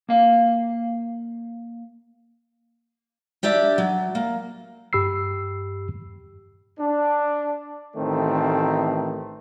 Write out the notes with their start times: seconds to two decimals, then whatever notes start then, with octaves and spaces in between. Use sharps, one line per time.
0.09 A#3 F5
3.43 D4 G4 D5 E5
3.78 F#3
4.15 A#3
4.93 G2 G4 B5 E6 C7
6.79 D4
7.96 A1 D#3 A3 C4